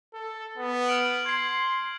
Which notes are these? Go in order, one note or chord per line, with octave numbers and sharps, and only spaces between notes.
A4
B3
F6 D7 F#7
C6 G#6 C7